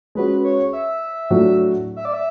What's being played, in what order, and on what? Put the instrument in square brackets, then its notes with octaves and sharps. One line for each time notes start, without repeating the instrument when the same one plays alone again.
[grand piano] G#3 C#4 F#4 [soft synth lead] B4
[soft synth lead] C#5
E5
[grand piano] A2 F#3 A3 D4 F#4
[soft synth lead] E5
D5
E5